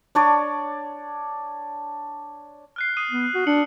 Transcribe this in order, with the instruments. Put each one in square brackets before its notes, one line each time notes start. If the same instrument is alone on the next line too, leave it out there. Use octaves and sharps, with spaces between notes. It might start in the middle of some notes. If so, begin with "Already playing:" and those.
[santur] D4 C#5 D5
[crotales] F6 F#6 C7
D#6 C7 D#7
[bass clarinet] B3
F#4
[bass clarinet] D4 [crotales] C#7 F#7